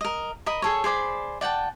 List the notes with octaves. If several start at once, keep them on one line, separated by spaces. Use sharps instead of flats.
A#4 D#5
A#4 D#5 B5 D#6
G#4 A4 C#5
G#4 C5 D5 B5
D5 F#5 G5 A5